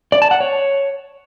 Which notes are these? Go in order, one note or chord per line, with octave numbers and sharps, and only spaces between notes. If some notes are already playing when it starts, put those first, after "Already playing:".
D5
A5
F#5
C#5